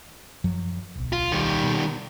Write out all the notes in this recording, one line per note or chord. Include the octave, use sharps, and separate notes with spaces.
F#2 F3 F#3
D1 B1
F4
D#3 G3
B2